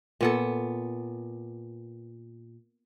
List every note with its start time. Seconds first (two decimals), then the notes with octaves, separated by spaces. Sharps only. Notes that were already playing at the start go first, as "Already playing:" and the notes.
0.21 A#2 B3 A4